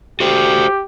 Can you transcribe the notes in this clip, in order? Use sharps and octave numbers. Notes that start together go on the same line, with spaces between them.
F#4 G4 A4 C5